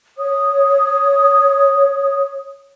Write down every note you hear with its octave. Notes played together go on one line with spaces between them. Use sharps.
C#5 D#6